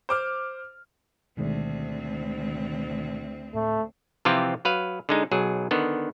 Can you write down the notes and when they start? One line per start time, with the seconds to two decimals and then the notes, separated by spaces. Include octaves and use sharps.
0.09 C5 D6 F6
1.37 D2 B2 D#3 G#3 C4
3.55 A2 A3
4.25 C3 E3 F3 C4 F4 G4
4.65 F#3 B4 F5
5.09 D3 G#3 D#4
5.31 B1 F#3 G#4
5.71 D3 D#3 B3